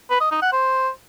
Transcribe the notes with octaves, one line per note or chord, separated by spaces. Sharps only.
B4
D#5
D#4
F#5
C5